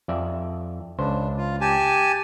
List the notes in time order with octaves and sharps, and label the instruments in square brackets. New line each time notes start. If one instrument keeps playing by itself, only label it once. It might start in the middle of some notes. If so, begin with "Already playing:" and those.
[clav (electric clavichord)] F2 D5 E5
[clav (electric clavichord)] C#2 C5 [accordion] D4
[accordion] F4
G4 G#5 A5